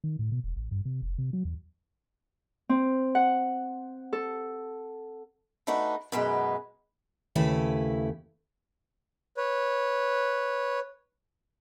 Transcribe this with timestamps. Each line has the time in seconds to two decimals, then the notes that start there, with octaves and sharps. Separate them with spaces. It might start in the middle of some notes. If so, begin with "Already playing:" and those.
0.04 D#3
0.19 A2
0.32 B2
0.44 E1
0.56 A1
0.71 G2
0.85 C3
1.02 F1
1.18 C3
1.33 F#3
1.45 E2
2.69 C4
3.15 F#5
4.13 A4
5.67 A3 D4 D#4 F#4 B4
6.12 F#2 B2 G#3 B4
7.35 D#2 C#3 A3 E4 B4 E5
9.37 B4 C#5